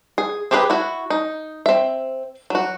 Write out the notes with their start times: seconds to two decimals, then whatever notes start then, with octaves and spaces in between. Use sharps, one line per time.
0.18 G#4
0.51 C4 G4 G#4 A#4 B4
0.70 E4 F#4
1.10 D#4
1.66 C4 E5
2.50 F#3 F#4